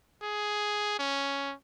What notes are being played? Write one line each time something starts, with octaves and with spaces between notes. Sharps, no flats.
G#4
C#4